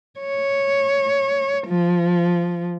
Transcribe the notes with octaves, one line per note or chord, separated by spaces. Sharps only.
C#5
F3